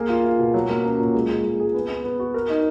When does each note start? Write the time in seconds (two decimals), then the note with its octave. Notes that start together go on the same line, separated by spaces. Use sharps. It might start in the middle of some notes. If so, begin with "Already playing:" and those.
Already playing: A#3 G#4
0.09 F4
0.25 F4
0.39 B2
0.54 F#3
0.69 A#3
0.84 C#4
1.00 A#2
1.14 G#3
1.30 G#3
1.44 G#3
1.59 G#4
1.74 B3
1.89 B3
2.04 B3
2.19 F#4
2.34 A#4
2.49 D#4